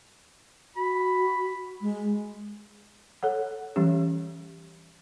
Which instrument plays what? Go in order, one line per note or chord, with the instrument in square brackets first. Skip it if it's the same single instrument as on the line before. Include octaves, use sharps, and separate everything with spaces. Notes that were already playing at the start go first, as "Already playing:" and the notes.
[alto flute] F#4 [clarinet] B5
[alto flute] G#3
[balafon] A4 C#5 F#5
E3 G3 C#4 G4